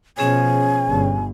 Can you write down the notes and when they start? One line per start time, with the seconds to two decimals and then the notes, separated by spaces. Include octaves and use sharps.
0.18 B2 F3 C#4 G#4 C#5 G#5
0.88 G1